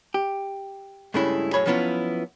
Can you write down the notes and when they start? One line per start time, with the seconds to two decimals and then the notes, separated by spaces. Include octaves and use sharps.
0.14 G4
1.14 G2 C#3 G#3 A3 C#4 E4
1.53 F#2 A2 G#4 C#5 B5
1.66 F3 F#3 B3 C#4 E4 F4